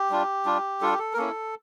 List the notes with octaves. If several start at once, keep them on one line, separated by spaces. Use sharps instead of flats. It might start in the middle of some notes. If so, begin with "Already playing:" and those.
Already playing: G4
G3 D4 F4
G3 D4 F4
G3 D4 F4 A4
G4
A4
A#4
A#3 C#4 E4 A4